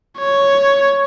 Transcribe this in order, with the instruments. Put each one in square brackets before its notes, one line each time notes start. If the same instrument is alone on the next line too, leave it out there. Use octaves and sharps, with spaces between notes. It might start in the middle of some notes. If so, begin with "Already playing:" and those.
[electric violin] C#5